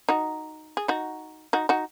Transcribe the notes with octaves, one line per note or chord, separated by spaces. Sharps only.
D#4 F#4
G#4
D#4 F#4
D#4 F#4
D#4 F#4